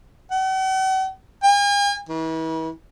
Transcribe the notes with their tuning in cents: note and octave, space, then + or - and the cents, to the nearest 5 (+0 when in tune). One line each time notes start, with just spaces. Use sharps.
F#5 +45
G#5 -45
E3 -40